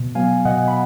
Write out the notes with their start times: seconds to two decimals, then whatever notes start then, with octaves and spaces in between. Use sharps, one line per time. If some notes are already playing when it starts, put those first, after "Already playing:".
Already playing: B2
0.15 F#3 B3 F5 G#5
0.45 B2 D#5 F#5
0.68 B5